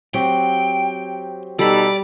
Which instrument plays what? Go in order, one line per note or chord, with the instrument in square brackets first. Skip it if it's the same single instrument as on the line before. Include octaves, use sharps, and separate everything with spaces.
[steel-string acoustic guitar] F#3 C4 G4 [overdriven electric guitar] G5
[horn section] B2 D#4 A4 [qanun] G3 B5 [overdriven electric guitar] D5